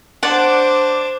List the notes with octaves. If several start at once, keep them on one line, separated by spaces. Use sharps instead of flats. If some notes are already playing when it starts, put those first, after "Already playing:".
D4 C5 D5 F#5